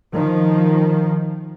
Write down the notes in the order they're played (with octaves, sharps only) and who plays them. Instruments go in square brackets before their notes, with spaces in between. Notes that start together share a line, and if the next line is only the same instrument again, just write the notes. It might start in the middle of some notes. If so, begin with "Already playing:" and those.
[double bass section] D#3 F3